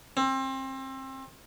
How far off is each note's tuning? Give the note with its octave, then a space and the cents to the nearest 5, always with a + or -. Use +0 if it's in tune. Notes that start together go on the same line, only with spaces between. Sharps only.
C4 +30